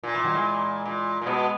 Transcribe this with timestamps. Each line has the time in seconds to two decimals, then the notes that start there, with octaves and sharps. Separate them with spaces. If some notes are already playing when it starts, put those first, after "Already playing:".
0.03 A#2
0.14 E3
0.24 D#3 F#3
0.34 E3 G#3
0.85 A#2
1.22 A#2
1.26 B2 G#3 B3